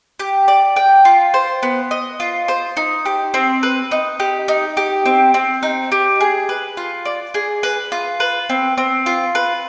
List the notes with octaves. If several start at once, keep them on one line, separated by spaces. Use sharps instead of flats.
G4
D5
G5
F4
C5
B3
D#5
F4
C5
D#4
G4
C4
B4
D#4
G4
D#4
G4
C4
C4
D#4
G4
G#4
B4
F4
D5
G#4
B4
F4
B4
C4
C4
F4
B4